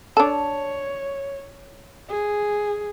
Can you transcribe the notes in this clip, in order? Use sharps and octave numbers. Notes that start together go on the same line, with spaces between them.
D4 A4 C#5
G#4